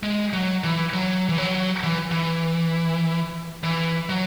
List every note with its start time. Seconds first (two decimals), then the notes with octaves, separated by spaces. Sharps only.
0.03 G#3
0.33 F#3
0.64 E3
0.93 F#3
1.29 E3
1.38 F#3
1.83 E3
2.11 E3
3.64 E3
4.09 F#3